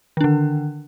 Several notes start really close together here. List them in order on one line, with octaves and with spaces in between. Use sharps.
D#3 D4 D3